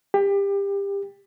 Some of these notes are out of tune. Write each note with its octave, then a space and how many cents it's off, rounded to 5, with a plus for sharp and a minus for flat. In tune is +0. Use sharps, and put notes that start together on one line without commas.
G4 +25